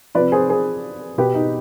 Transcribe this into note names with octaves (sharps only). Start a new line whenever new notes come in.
C3 F3 B4 D5
G#4 C5
G#4 C5
B2 G4 B4
D#4